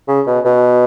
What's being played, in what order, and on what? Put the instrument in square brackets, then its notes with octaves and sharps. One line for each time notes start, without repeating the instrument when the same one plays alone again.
[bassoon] C#3
B2
B2